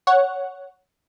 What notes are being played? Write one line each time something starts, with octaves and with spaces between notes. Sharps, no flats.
C#5 F#5